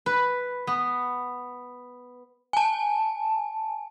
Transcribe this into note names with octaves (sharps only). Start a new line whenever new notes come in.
B4
B3
G#5 A5